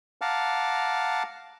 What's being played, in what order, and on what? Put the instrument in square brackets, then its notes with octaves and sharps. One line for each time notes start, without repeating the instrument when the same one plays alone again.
[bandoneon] F5 F#5 A5 A#5 D6 F6